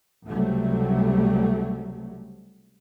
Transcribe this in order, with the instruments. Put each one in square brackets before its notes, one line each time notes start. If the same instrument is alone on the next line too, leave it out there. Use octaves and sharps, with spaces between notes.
[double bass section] C#2 C3 F#3 G3 A3